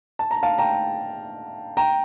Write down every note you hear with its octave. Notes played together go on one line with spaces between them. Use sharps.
A5
A#5
F5 A5
G5 A#5
G5 A#5